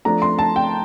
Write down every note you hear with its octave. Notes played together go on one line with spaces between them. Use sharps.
F3 A3 D4 A#5
C6
A5
G5